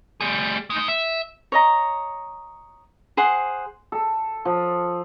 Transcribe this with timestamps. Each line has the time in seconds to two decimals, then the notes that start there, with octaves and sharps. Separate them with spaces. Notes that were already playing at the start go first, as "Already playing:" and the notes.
0.21 G3 G#4
0.70 G#3 D#4
0.88 E5
1.52 C#5 D#5 A#5
3.17 G#4 C5 F#5
3.92 A4
4.45 F3